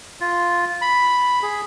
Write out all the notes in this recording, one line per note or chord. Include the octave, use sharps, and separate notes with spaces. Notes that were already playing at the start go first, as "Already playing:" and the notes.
F4
B5
G#4